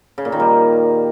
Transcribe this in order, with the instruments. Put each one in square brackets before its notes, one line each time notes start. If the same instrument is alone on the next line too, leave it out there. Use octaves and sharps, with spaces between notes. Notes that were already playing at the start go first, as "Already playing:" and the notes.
[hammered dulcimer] C#3
A#2
D#3
G3